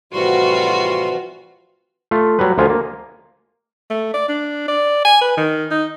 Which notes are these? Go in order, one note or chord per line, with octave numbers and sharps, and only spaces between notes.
A2 C3 E3 F3 G3 F4 F#4 C6
A3 F4
F#3 G3 B4
D2 F3 F4 F5 G#5
A#3
A3
D5
D4
D5
G#5
B4
D#3
D#4